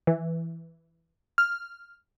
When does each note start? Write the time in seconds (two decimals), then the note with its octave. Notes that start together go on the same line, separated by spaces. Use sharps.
0.07 E3
1.38 F6